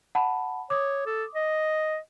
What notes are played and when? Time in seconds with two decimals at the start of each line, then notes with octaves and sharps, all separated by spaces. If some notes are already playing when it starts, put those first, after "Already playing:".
0.15 F#5 A5 B5
0.70 C#5 D6 D#6
1.06 A4
1.35 D#5